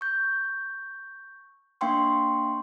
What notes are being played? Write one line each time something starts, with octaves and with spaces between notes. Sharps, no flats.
C#6 G6
A#3 D4 F5 G5 C6 C#6